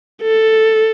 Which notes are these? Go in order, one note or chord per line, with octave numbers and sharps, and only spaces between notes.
A4